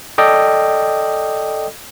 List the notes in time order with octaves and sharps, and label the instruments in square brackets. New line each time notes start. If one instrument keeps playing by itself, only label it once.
[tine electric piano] A4 D5 D#5 G5